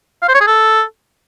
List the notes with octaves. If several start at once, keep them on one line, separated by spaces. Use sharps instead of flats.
F5
C5
C#5
G#4
A4